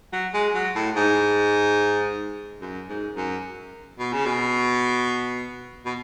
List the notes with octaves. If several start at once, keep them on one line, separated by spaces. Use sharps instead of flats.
F#3
G#3
F#3
A2
G#2
F#2
G#2
F#2
B2
C#3
B2
B2